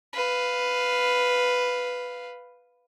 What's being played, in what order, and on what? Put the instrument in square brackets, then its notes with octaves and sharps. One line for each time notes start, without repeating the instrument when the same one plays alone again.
[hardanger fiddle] B4 F5